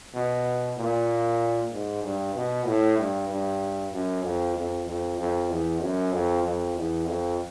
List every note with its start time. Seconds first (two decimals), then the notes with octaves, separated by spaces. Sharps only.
0.14 B2
0.77 A#2
1.72 G#2
2.03 G2
2.35 B2
2.66 A2
2.98 G2
3.29 G2
3.92 F#2
4.23 F2
4.56 F2
4.86 F2
5.18 F2
5.50 E2
5.81 F#2
6.12 F2
6.44 F2
6.76 E2
7.07 F2